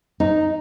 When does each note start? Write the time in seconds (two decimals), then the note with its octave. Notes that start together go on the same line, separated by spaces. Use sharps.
0.20 D#4